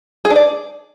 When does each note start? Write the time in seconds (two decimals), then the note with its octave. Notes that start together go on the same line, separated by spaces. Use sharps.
0.25 G#4
0.30 D4
0.36 D5